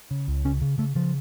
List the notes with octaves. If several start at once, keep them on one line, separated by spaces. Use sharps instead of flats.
C#3
C#2
C#3 C#4
C#3
C#3 A3
C#3 F3